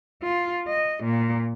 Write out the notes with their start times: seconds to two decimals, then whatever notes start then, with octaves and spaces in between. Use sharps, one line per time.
0.23 F4
0.67 D#5
1.04 A#2